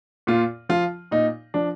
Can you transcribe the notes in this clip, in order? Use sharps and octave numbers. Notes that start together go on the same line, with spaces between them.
A#2 F4
F3 F4
A#2 D#4
F3 D4